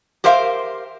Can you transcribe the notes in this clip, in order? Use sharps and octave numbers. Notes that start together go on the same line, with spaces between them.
G4 A#4 C5 E5 F5